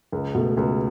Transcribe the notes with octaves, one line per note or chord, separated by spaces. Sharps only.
C#2
B2 A3
C#2